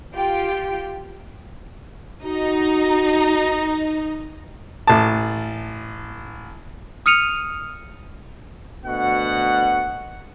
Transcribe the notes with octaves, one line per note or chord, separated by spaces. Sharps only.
F4 G4 G5 D7
D#4 F#4
A1 A5
D#6 F6 C#7 D#7 F7
D2 B2 F#4 F#5